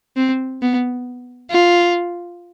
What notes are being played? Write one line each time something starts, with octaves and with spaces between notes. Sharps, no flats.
C4
B3
F4